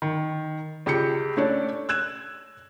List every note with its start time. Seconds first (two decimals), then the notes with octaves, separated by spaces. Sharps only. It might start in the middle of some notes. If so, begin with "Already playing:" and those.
0.02 D#3
0.86 C#2 G4 G#4 G6 C#7
1.37 A3 C#4 D4 C#5 D5
1.89 E6 F#6 G#6 E7